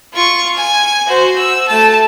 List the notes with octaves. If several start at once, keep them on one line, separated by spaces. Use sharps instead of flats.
F4 C#6
G#5
F#4 C5
E6
A3 A5